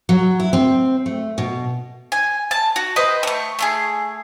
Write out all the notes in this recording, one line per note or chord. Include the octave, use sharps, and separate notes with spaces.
F#3
E4
C4
A3
B2
G#5
A5
F#4
B4 C5 D#5 G5
A3 C#6
A3 F4 G#4